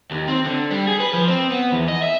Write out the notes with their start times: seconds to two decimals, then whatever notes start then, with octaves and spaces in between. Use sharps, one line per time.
0.11 D#2
0.28 C4
0.46 D3
0.71 G3
0.88 G#4
1.00 B4
1.13 F3
1.28 C4
1.51 B3
1.72 E2
1.88 D#5
2.02 E5